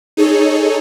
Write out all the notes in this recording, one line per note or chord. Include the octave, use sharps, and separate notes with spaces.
D#4 G#4 A4 C#5